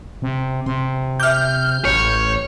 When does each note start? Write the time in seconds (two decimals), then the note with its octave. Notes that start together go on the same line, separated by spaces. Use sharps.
0.22 C3
0.66 C3 C6
1.20 E5 D6 F6 G6
1.85 A1 B4 C#5